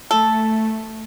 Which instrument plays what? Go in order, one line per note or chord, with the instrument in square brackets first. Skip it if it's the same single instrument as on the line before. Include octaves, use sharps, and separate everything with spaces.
[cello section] A3 [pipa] A4